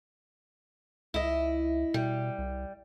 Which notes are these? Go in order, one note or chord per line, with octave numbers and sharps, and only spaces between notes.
C#2 E4 D#5
B2 G3
C2